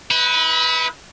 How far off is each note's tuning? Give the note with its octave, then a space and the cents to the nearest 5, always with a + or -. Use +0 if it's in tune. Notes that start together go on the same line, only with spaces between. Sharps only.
E4 -45 B4 +0